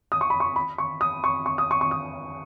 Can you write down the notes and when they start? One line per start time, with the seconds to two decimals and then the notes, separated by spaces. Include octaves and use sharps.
0.12 D#6
0.21 C#6
0.30 B5
0.40 C#6
0.56 B5
0.78 C#6
1.01 D#6
1.24 C#6
1.46 C#6
1.58 D#6
1.71 C#6
1.81 C#6
1.91 D#6